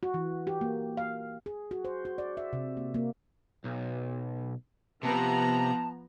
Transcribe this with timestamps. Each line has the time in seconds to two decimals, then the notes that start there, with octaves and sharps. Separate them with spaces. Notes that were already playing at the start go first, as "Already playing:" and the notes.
0.03 F#4
0.14 E3
0.47 G4
0.61 A#3
0.97 F5
1.46 G#4
1.71 F#4
1.85 C5
2.05 F#4
2.18 D5
2.37 E5
2.53 C3
2.77 A#3
2.94 A#3
3.64 B1
5.03 C3 F3 B3 A5 A#5